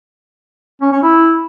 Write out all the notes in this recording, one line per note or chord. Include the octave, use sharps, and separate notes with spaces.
C#4
C#4
E4